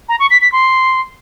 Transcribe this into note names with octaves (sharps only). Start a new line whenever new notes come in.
A#5
C#6
B6
B6
C6